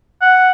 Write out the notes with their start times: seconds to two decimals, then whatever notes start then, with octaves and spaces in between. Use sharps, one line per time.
0.21 F#5